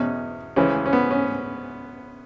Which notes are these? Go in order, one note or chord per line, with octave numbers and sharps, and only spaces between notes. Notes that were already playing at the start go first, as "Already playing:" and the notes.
Already playing: E2 B2 C#4
C#2 C#3 E3 C#4
C#4
B3
C#4